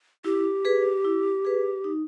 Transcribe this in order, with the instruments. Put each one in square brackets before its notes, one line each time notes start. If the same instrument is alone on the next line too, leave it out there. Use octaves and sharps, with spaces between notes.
[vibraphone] E4 [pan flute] G4
[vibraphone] G#4 B4
E4
G#4 B4
D#4